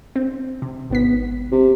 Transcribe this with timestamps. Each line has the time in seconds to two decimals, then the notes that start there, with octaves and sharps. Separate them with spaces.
0.16 C4
0.62 C3
0.90 G#1 B3 B6
1.52 C3